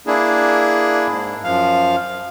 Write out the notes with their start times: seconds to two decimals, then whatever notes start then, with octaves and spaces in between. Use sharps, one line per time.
0.07 A#3 D4 E4 G#4
1.07 G#2
1.44 F#2 F3 F5